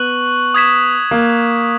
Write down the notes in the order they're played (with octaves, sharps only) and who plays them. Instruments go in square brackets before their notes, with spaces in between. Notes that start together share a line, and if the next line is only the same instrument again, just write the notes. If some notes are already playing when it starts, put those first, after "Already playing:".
Already playing: [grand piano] B3 [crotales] C#6 F#6 F#7
[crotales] D#6 G#6 B6 E7
[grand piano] A#3